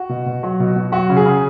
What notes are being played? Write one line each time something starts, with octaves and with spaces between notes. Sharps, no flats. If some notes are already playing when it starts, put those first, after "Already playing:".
Already playing: F#4
B2
B2
F#3
B2
B2
F#3 F#4
C#3
G#4
C#3